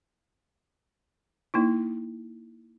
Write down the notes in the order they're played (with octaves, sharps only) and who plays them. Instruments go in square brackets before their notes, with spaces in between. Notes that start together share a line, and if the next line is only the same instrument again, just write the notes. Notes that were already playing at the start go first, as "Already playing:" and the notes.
[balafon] A#3 D#4 E4